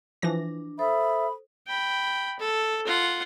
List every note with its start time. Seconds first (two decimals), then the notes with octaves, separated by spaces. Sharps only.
0.22 E3 F3 D4 A#6
0.79 A4 C5 E5 B5 D#6
1.67 G5 B5
2.39 A4
2.87 F4 F#5